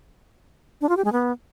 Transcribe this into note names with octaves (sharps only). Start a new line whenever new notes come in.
D4
F4
G4
G#3
B3